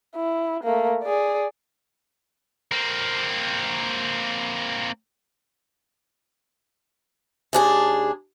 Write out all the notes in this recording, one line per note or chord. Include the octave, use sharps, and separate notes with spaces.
E4
A3 A#3
G#4 D5
A#3 C4
D#2 D4 G#4